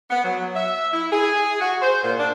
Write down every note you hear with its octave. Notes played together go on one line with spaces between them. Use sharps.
B3
F#3
E5
E4
G#4
F#4
C5
A#2
D4